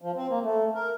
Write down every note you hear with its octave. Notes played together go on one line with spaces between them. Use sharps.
F3
C4
A#3
A3
A#4